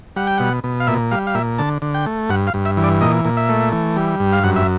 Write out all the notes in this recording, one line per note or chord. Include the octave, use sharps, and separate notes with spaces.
G3 F#5
G5
B2 F#5
B2
F5
A#2 E5
G3 F5
F5
A#2 E5
D3 A5
D3
G5
A3
G2 F#5
F5
G2
E5
E3
D5
A#2 D#5
A#2
E5
A3
E3
G3
G2
F5
F#2 F#5
E5